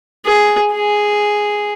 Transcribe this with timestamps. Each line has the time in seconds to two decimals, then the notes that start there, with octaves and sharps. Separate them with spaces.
0.25 G#4
0.72 G#4